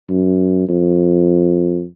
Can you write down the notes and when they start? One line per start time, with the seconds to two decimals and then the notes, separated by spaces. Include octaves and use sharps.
0.09 F#2
0.69 F2